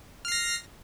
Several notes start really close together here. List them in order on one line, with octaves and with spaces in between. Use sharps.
F6 C7 A#6